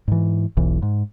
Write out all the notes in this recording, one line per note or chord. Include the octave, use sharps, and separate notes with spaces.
G#2 E3
E1 B1 E3
G#2